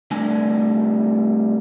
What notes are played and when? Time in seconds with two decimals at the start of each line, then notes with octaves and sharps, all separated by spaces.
0.11 C3 G3 A3 D4 G#5